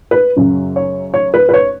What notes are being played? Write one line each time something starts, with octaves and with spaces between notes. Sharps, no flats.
B4
F#2 C#3 F#3 C#4
C#5
C#5
B4
B4
C#5